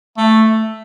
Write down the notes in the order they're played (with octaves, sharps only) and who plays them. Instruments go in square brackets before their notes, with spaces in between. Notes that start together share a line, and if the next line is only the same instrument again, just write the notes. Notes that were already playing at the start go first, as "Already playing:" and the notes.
[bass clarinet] A3